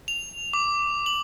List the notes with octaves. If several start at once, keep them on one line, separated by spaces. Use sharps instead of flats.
F7
D6
F#7